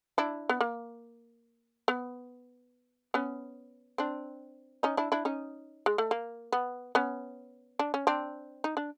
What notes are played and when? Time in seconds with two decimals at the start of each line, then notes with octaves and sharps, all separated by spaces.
0.18 D4 E4
0.49 B3
0.61 A#3
1.88 B3
3.14 B3 C#4
3.98 C4 D4
4.83 C#4 D#4
4.97 D4 E4
5.12 D4 E4
5.25 C#4 D#4
5.86 G#3
5.98 A3
6.11 A#3
6.53 B3
6.95 B3 C#4
7.79 D4
7.94 C#4
8.07 C4 D4
8.64 D#4
8.77 D4